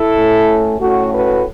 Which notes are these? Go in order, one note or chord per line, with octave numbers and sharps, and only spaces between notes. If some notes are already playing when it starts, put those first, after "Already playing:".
Already playing: E4 A4
A2 A3 C#4
A2 A3 C#4 F#4
F#4 B4